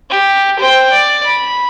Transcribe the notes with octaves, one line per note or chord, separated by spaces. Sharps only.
G4
C5 G5
D5
B5